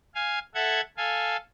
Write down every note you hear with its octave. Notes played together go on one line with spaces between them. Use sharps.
F5 G#5
A4 E5 F#5 G#6
A4 F5 G#5